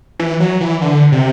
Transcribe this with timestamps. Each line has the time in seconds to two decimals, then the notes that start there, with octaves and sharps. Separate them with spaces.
0.20 E3
0.40 F#3
0.61 E3
0.81 D3
1.12 C3